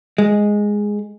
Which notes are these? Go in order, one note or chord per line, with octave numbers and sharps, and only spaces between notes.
G#3